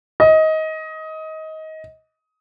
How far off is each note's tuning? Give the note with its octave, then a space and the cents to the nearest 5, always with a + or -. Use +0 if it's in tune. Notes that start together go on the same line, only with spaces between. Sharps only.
D#5 +20